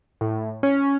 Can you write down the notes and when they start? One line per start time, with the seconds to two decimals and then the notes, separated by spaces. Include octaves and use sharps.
0.21 A2
0.63 C#4